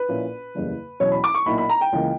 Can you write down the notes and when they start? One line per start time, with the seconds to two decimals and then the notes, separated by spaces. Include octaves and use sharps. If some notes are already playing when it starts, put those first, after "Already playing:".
Already playing: B4
0.09 A#1 A#2 A#3 C#4 E4
0.55 F#1 E2 C#3 G3
1.00 E2 B2 F#3 C#4 C#5
1.12 B5
1.24 D6
1.34 C#6
1.46 B1 A#2 A#3 E4 B5
1.58 B5
1.69 A#5
1.81 G5
1.93 C#2 C#3 E3 A#3